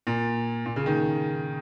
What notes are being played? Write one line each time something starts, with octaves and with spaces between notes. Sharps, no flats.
A#2
A#2
C#3
D#3